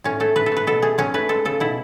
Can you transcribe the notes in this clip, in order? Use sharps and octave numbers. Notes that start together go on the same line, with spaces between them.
A2 C#4
A3 A4
A3 B4
A4
A3 B4
B2 A4
A3 G#4
F#3 C#4
A3 B4
G#3 A4
C#3 A4
B2 E4